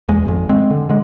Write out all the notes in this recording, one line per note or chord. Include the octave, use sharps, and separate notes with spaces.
E2 G#3
G#1 F2
G#3 C4
D3
D3 G#3